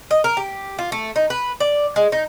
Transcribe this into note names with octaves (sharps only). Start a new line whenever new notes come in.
D#5
A#4
G4
F4
A3
D#4
B4
D5
G#3
D#4